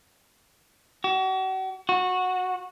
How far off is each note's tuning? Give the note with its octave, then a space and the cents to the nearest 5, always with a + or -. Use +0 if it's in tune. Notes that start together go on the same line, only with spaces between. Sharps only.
F#4 +40
F#4 -15